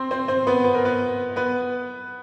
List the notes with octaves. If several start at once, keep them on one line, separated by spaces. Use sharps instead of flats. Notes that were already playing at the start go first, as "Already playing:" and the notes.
Already playing: C4 C5
C4 C5
C4 C5
B3 B4
B4
A#4
B3 B4
B3 B4